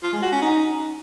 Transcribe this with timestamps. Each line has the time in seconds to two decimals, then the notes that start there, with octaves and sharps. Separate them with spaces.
0.03 F4
0.13 G#3
0.23 F#4
0.32 C#4
0.42 D#4